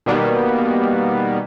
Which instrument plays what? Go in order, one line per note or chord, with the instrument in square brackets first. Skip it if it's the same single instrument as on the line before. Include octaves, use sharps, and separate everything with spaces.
[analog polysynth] B2 D#3 G3 A#3 B3